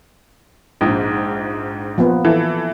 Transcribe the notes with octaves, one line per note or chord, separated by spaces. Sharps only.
A#1 G#2
F3 A#3 B3
E3 A4